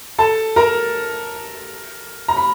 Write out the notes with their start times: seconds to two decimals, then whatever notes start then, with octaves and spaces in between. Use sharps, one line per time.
0.18 A4 A5
0.56 A#4 A#5
2.28 A#5
2.37 B5